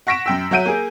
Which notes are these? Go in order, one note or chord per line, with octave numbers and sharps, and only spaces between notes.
F#5 C#6 A#6 B6 D7 E7
F#2 G5 E6
F#3 E5 F#5 G6 D7 D#7
A#3 G#4